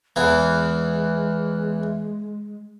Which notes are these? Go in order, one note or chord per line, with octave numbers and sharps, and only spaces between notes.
E2 E3 G#3